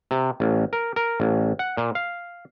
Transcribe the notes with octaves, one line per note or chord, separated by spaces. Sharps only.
C3
A1
A#4
A#4
A1
F#5
A#2
F5